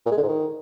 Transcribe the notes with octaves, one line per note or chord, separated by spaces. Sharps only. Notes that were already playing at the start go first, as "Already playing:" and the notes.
A#2
G#3
D3
G#2
D#3